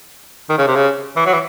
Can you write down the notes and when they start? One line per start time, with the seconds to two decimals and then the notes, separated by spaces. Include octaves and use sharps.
0.50 D#3
0.58 C#3
0.67 C3
0.76 C#3
1.16 E3
1.26 F#3
1.33 E3